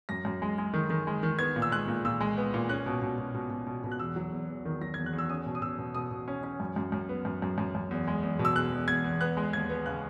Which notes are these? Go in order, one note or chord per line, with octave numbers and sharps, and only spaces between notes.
F#2 A#6
F#2
G#3
G#3
D#3
D#3
G#3
D#3
B3 G#6
A#2
E6
G#3 F#6
A#2
A#2 E6
G#3
B3
A#2
C#4 F#6
B2
B2
B2
B2
B2
B2
B2
F#6
E2 E6
F#3
E2
E2
D#3
F#3 A#6
E2 G#6
F#6
E2
E6
C#4 D#6
B2
D#6
B2 E6
B2
B2 D#6
B2
C#4
C#4
F#2
F#2
F#2
B3
F#2
F#2
F#2
F#2
E2
G#3
E2
B2
E6
E2 F#6
E2
E2 G#6
E2
B3 F#6
G#3
D#2 G#6
B3
C#3 F#6